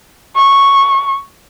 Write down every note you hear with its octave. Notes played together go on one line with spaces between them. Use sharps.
C#6